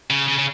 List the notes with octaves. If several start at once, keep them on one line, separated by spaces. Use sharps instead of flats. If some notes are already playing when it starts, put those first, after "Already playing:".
C#3
C#3
C#3